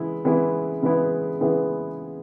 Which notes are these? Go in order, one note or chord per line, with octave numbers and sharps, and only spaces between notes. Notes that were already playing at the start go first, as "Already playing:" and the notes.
Already playing: C#3 E3 G#3 B3 E4
C#3 E3 G#3 B3 E4
C#3 E3 G#3 B3 E4
C#3 E3 G#3 B3 E4